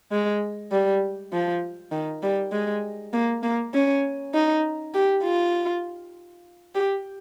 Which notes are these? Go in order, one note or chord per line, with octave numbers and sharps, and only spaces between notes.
G#3
G3
F3
D#3
G3
G#3
A#3
A#3
C#4
D#4
G4
F4
G4